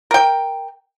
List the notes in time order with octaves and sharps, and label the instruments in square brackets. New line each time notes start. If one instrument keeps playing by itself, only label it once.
[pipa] A#4 G5